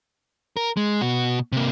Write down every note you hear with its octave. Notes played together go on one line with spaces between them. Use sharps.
A#4
G#3
B2 F#4
C3 A#3